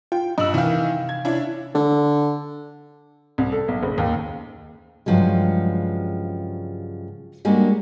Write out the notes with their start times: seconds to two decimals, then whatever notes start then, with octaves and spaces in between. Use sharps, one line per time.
0.12 F4 G5
0.38 G2 D#5 E6 F#7
0.54 C3 D#3 E3 F5
1.09 G#6
1.25 C#4 D4 E4
1.75 D3
3.38 C2
3.52 A4
3.68 B1
3.83 F#1
3.98 D#2
5.06 G2 C#3 F3 F#3 G#3
7.45 G3 G#3 A#3 C#4 D4 F#4